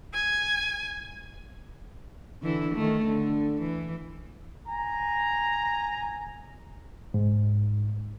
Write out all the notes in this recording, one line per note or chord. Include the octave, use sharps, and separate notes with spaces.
G#5
D3 E3 E4
D#3 A3
D3
E3
G#5 A#5
G#2